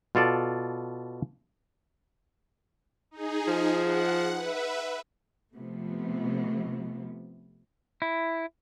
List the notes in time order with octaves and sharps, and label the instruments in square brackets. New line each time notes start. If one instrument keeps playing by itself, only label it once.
[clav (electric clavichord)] B2 F4 A4 D5
[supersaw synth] D#4 G#4
[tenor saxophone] F3
[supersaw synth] F#5
B4 E5
[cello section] C3 F3 A3 B3
[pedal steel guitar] E4